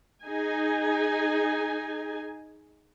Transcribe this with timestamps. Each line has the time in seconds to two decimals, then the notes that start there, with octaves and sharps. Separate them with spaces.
0.24 D#4 G#4 G#5